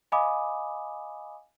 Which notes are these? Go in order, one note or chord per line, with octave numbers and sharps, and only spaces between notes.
D#5 F5 G#5 B5 D6 D#6